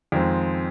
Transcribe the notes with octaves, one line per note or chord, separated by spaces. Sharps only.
F2 D#3 G#3 C4